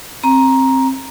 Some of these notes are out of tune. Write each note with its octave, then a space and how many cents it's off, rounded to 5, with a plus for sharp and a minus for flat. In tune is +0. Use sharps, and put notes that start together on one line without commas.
C4 +15 A#5 +10